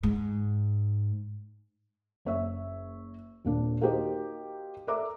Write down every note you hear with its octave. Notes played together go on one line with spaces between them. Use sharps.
G#2
F#1 C#5 E5
D#1 A#2 D4
A#3 D#4 F#4 G4 C5 D#5
A4 A#4 D5 E5 A#5 D6